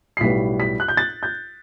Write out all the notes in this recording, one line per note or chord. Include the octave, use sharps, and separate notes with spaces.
C7
B1 A2 G3 B3 B6
B6
F#6
G6
A6
G6